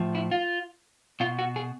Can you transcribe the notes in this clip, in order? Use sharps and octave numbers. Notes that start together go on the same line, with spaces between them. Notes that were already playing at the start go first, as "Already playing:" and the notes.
Already playing: A2 F3
E4
F4
B2 F4
F#4
G#4